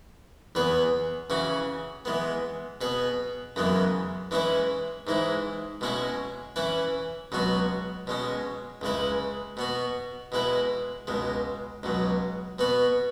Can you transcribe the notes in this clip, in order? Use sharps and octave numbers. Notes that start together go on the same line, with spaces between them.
E2 E3 B3 G#4 B4
C#3 E3 C#4 F#4
E3 G#3 B3
B2 B3 G#4 B4
F#2 C#3 E3 G#3 B3
E3 G#3 C#4 E4 B4
G#2 E3 G#3 E4
B2 G#3 C#4 E4 G#4
E3 C#4 E4 B4
C#2 B2 F#3 B3 F#4
B2 G#3 C#4
C#2 C#3 G#3 E4 B4
B2 B3 F#4
B2 G#3 E4 B4
C#2 B2 G#3
C#2 B2 F#3
B2 B3 F#4 B4